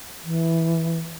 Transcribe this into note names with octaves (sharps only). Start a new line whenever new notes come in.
E3